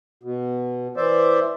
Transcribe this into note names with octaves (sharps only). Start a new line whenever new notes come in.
B2
E3 C5 D5 E5